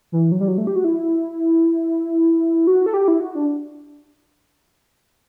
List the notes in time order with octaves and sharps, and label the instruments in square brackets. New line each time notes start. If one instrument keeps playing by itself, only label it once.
[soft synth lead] E3
F#3
G3
F#3
A3
G4
F#4
E4
F#4
A4
G4
E4
F#4
D4